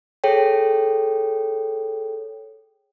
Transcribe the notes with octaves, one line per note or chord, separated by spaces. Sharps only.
G#4 A4 C#5 G5